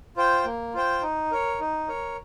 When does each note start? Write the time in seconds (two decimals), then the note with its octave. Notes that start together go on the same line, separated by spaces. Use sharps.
0.17 F4 C5 G5
0.45 A#3
0.74 F4 C5 G5
1.02 D#4
1.31 A#4 C#5
1.60 D#4
1.88 A#4 C#5